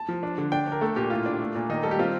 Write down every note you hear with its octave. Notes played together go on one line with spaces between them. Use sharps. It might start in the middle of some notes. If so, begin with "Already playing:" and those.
Already playing: A5
F3
D4
D3
D4 G5
D4 A#4
A3 A4
A#2 G4
A2 F4
D4
A3
A#2
D#3 D#4
G3 A4
G4
C4 F4